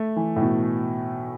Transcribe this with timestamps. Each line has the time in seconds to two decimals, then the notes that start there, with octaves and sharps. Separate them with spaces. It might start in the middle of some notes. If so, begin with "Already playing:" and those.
Already playing: A3
0.16 E3
0.36 A2
0.41 B2